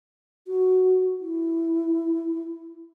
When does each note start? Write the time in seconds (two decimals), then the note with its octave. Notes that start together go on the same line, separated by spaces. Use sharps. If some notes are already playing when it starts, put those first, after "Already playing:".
0.47 F#4
1.21 E4